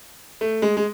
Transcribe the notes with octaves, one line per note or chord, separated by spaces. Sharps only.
A3
G#3
G#3